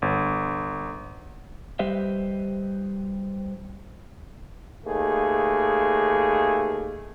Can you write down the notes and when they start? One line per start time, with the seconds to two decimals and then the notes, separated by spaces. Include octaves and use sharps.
0.02 G1
1.79 G3 G4 B4 C5 D#5 E5
4.86 D#2 A3 G#4